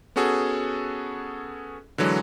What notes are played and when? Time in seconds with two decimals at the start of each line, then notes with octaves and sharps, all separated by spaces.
0.16 B3 C#4 F#4 G#4 A4
1.98 D3 E3 F#3 G#3